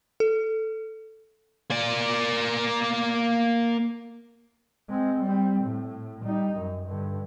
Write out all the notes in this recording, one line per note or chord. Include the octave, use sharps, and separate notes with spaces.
A4
A#3 D5
G#3 C4
G3 C4
A2
G3 D#4
F#2
G2 D3